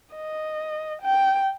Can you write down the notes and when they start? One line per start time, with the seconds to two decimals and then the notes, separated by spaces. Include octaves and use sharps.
0.15 D#5
1.02 G5